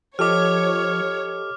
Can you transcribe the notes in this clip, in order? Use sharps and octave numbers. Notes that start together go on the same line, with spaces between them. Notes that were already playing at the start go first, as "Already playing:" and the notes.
F3 G4 A4 C#5 D#5 D6 F6